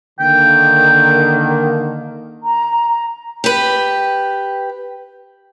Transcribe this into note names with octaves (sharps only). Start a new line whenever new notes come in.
D3 D#3 A#3 G5
A#5
G4 B4